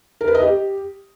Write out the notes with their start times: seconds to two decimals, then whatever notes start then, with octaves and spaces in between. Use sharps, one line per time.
0.21 A#4
0.28 B4
0.35 D#5
0.42 G4